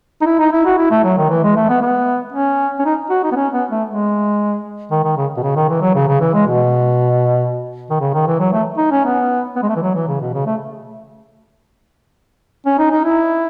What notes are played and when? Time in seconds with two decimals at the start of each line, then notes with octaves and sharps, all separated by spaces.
0.22 D#4
0.26 E4
0.39 D#4
0.52 E4
0.66 F#4
0.78 E4
0.91 A3
1.04 F#3
1.17 D#3
1.30 E3
1.43 G#3
1.56 A3
1.69 B3
1.82 B3
2.33 C#4
2.79 C#4
2.85 D#4
3.10 F#4
3.24 D#4
3.32 B3
3.36 C#4
3.53 B3
3.71 A3
3.88 G#3
4.91 D#3
5.04 D#3
5.17 C#3
5.37 B2
5.43 C#3
5.56 D#3
5.69 E3
5.81 F#3
5.95 C#3
6.08 C#3
6.21 E3
6.34 G#3
6.46 B2
7.90 D#3
8.01 C#3
8.14 D#3
8.27 E3
8.40 F#3
8.53 A3
8.78 D#4
8.92 C#4
9.05 B3
9.56 B3
9.63 G#3
9.69 A3
9.76 E3
9.82 F#3
9.95 E3
10.08 C#3
10.21 B2
10.34 C#3
10.46 A3
12.66 C#4
12.79 D#4
12.91 D#4
13.05 E4